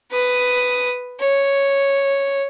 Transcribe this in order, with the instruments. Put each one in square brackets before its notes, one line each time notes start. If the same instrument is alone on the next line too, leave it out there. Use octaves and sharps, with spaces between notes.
[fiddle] B4 D#6
C#5